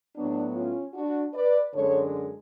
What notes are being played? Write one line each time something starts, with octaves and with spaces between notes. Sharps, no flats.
A2 F#3 B3 D4
C#4 F4
D4 F#4
B4 D5
F#2 D3 G#3 A4 C#5